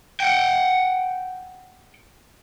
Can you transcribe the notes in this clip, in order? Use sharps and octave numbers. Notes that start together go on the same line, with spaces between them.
F#5 G5